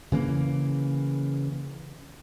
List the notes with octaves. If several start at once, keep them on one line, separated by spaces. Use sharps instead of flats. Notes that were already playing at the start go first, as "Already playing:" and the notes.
C#3 E3 A#3